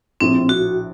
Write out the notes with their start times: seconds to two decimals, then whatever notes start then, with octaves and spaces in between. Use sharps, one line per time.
0.21 A#1 A2 F3 C4
0.49 F#4